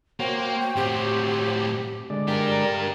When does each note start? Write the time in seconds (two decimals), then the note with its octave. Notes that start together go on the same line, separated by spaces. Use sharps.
0.20 A#3 F#4 C5 C#5 G5
0.60 G5
0.76 A2 C4 G4
2.10 D3 G#3 D5
2.28 D4 G4 A#4